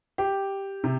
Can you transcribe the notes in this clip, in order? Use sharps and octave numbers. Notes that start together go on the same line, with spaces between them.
G4
C3